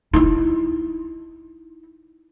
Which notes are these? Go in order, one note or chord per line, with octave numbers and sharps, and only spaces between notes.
D#4 E4